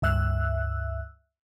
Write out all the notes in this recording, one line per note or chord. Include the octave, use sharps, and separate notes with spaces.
C#2 G2 E5 E6 F#6